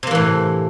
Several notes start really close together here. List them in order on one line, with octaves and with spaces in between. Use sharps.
C3 A#3 E3 A2